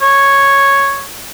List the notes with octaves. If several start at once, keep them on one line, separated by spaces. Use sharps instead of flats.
C#5